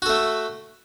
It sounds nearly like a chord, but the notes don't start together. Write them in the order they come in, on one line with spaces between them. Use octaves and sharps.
F#4 A4 A3